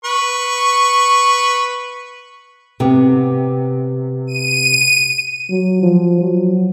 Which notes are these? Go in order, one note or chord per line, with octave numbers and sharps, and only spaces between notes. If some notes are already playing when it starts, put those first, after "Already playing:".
B4 C#6
C3 B3
D#7
F#3
F3
F#3